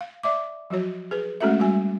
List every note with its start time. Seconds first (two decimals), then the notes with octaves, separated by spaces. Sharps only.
0.01 F5
0.23 D5 E5 D6
0.70 F3 F#3 F#4 C#5
1.11 G#4 B4
1.40 G#3 A3 C#4 F#4 A4 E5
1.60 G3 F#4 G#5